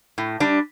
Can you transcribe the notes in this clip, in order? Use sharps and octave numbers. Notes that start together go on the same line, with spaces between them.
A2
G3 D4